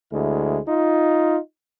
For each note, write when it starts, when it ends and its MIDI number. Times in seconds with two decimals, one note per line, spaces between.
0.12 0.58 38
0.12 0.58 56
0.12 0.58 64
0.67 1.38 63
0.67 1.38 65